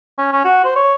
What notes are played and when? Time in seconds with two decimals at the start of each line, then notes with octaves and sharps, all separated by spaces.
0.18 C#4
0.32 C#4
0.44 F#4
0.65 C5
0.76 C#5